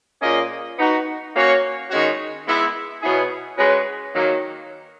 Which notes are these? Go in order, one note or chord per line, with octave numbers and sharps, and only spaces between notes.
A#2 A#3 C#4 G#4 D#5
B3 D#4 F#4
A#3 C#4 F#4 C#5
D#3 G#3 C#4 F#4 C#5
G#3 B3 E4
B2 F#3 B3 E4 G#4
G#3 C#4 F#4 B4
D#3 F#3 A#3